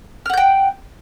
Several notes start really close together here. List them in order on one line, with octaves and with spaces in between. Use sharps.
F6 F#5 G6 G5